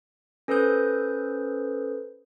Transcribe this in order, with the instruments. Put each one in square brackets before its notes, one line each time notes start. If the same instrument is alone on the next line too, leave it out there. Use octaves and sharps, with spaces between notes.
[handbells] C#4 A4 B4 C5 D#6 G6